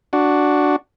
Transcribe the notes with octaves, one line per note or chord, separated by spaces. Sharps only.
D4 F#4